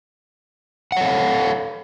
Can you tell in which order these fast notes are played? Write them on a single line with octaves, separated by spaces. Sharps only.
F#5 C#5 A4 F5